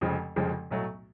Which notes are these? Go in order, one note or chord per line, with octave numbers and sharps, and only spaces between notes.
F1 F2 C#3 F3 G#3
F1 F2 C#3 F3 G#3
B1 A2 F#3 A3